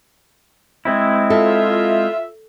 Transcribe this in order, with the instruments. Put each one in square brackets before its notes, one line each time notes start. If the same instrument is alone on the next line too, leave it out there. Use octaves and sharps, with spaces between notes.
[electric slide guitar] G#3 C4 E4
[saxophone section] F4 E5 [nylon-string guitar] A4